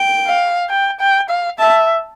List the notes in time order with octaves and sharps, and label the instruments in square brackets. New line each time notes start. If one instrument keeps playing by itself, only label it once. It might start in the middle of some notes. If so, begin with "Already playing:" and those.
Already playing: [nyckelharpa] G5
[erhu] F5
G5
G5
F5
[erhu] E5 [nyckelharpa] A5